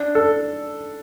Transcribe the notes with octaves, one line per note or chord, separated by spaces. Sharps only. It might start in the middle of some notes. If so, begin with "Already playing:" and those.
Already playing: D4
A4